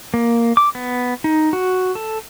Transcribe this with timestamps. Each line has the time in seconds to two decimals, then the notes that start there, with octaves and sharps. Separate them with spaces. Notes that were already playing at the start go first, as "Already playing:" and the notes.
0.14 A#3
0.57 D6
0.75 B3
1.24 D#4
1.53 F#4
1.95 A4